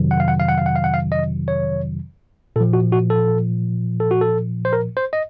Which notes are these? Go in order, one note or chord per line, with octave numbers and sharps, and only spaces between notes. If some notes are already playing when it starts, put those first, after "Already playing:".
Already playing: F2 C3 D#3 F#3
F#5
F5
F#5
F5
F#5
F5
F#5
F5
F#5
F5
D#5
C#5
A#2 F3 A4
F#4
F#4
A4
A4
F#4
A4
C5
A#4
C5
D#5